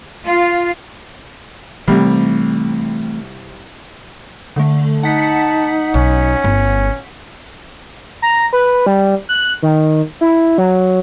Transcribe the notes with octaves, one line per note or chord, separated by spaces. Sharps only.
F4
C2 E3 G3 A3 C4
D3 A3
D#4 F#5 A5 B6 C#7
B1 C#4
G1 E4
A#5
B4
G3
F#6
D#3
E4
F#3